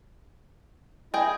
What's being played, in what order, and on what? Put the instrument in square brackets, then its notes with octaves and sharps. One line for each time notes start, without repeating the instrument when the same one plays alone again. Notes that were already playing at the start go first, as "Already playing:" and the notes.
[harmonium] E4 D#5 [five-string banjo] G#4 G5